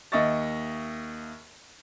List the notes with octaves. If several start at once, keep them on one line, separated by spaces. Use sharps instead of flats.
D#2 D#5 E5 C#6 A6